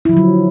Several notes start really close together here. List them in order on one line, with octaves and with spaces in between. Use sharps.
E4 F3 D3 F#3